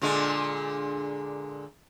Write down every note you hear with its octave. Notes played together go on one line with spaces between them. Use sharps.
A#2 D3 G#3